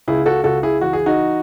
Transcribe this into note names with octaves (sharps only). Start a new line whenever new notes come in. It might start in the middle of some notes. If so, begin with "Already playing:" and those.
C#2 E4 G#4
F#4 A4
C#2 F#4 A4
E4 G#4
E3 F#4
G#4
D#4 F#4